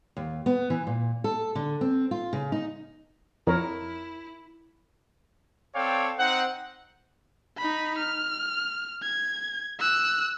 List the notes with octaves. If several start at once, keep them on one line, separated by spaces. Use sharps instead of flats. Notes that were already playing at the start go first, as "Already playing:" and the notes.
D#2
B3
E3
A#2
A4
D3
C4
F4
C#3
D#4
F2 E4 A#4 C#5 A#5
C4 A4 C#5 D5 F5 G5
C4 D#4 C5 F#5
D#4 B5
F6
G#6
E6 F#6